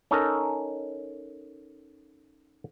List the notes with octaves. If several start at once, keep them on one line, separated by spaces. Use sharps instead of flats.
C#4 D#4 A4 A#4